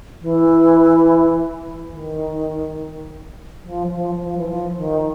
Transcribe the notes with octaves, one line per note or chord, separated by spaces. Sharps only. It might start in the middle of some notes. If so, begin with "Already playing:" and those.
E3
D#3
F3
F3
F3
E3
F3
D#3